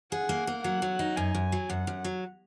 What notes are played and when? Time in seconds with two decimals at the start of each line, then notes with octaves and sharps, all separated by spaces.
0.12 G#4 F#5
0.29 A#3
0.47 A#3
0.64 F#3 F#5
0.82 F#3
0.99 D#4
1.16 F#2 G#5
1.34 F#2
1.52 F#3
1.69 F#2 F#5
1.87 F#2
2.04 F#3